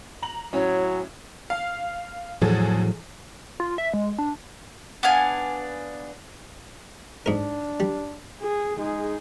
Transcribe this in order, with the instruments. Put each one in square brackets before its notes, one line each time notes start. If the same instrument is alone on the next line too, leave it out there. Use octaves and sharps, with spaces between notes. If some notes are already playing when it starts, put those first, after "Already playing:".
[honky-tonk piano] A#5 F#7
[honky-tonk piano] A2 C#4 [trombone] F#3 [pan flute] C#5
[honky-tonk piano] F5
[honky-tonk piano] E2 G#4 A4 [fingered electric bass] A2 F3 F#3
[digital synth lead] F4
E5
G#3
D4
[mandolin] B3 D4 F5 G#5
[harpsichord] G#2 A#4 [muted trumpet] D4
[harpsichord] G3
[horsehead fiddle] G#4
[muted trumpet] G#3 [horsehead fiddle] D#4 G#4